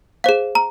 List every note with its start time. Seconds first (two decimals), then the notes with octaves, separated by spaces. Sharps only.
0.24 G#4 C5 F5
0.55 A#5